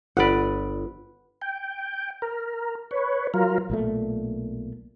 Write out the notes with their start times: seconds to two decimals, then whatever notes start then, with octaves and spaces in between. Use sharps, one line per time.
0.17 G1 B4 D5 F#5
1.42 G5
2.22 A#4
2.91 B4 C#5
3.34 F#3 F4 A#4
3.70 B1 A#2 A3